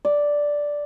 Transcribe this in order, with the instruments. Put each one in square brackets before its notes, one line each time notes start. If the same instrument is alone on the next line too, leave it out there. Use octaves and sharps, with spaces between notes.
[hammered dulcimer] D5